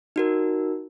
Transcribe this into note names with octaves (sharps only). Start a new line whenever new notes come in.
D#4 F#4 A#4